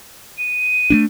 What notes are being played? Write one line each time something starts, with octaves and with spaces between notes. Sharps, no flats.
D#7
A3 A#3 D4